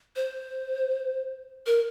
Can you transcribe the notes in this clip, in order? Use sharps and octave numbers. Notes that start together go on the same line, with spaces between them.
C5
A#4